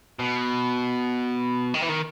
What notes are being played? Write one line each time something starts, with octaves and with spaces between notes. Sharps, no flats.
B2
D#3
E3
D#3